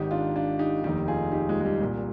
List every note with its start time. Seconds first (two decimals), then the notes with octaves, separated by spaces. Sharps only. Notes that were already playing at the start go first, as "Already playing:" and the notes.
Already playing: G#1 G#2 D#3 D#4 G4
0.11 D4 F4
0.36 D4 F4
0.59 D#4 G4
0.84 F1 D#2 D#3 D#4 G4
1.08 F4 G#4
1.32 D#4 G4
1.49 F3 G#3
1.61 G#3
1.65 G3
1.80 C2 A#2